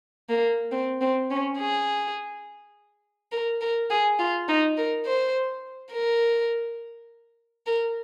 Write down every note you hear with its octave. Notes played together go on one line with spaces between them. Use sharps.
A#3
C4
C4
C#4
G#4
A#4
A#4
G#4
F4
D#4
A#4
C5
A#4
A#4